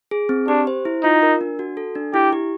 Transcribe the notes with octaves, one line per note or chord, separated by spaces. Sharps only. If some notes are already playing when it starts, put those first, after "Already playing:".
G#4
C4
D4 G4
C5
E4
D#4 F4
A#4
D4
F#4
A4
D4
E4 G4
G4